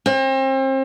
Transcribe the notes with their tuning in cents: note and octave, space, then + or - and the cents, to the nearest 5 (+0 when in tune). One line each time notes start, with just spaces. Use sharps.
C4 +35